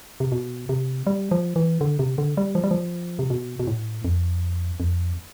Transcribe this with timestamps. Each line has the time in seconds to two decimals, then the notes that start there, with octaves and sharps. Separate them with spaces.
0.20 C3
0.32 B2
0.69 C3
1.07 G3
1.31 F3
1.56 E3
1.81 D3
1.99 C3
2.18 D3
2.37 G3
2.55 F3
2.64 G3
2.71 F3
3.19 C3
3.30 B2
3.59 B2
3.67 A2
4.05 F2
4.80 F2